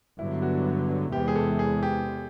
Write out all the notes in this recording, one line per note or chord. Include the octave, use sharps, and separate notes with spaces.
G2 D3 F#3 B3 E4
F#4
E2 C3 E3 G#3 G4
G#4
A4
G#4
G4